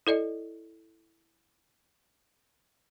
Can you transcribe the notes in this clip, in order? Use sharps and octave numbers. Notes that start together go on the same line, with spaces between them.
E4 A4 D5 D#5